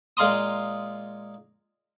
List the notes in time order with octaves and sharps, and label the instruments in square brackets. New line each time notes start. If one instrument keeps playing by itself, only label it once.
[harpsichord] A#2 G#3 F5 A#5 C6 D#6